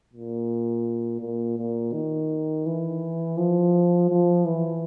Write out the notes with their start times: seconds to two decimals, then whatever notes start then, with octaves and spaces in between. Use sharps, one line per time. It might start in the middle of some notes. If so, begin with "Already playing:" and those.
0.13 A#2
1.21 A#2
1.58 A#2
1.93 D#3
2.66 E3
3.38 F3
4.10 F3
4.45 E3